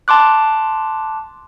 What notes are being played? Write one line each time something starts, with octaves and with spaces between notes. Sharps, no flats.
A5 C6 D6 F#6